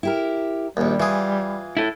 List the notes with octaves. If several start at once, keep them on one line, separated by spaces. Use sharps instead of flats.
E4 G4 A#4
A#1 D#2 G3
E3 F4 G#4
E4 A4